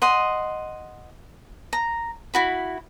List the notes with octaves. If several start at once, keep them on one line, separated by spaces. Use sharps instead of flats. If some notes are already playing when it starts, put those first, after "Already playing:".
D#5 F#5 C6
A#5
E4 F#4 B5